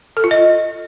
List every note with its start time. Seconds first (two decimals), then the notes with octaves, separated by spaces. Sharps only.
0.17 A4
0.24 F4
0.31 D#5